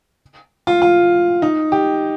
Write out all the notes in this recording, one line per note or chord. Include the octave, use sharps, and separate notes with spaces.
F4
F4
D#4
G4